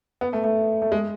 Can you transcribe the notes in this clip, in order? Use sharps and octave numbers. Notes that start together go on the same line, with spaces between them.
B3
A3
A3
A3
G#3